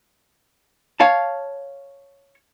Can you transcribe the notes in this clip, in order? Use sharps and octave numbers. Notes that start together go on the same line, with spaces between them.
C#5 F5 A5